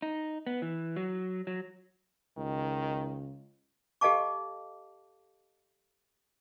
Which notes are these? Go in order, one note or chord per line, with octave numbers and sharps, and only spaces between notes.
D#4
B3
E3
F#3
F#3
C#2 D#3
G4 A4 D#5 F5 A5 D6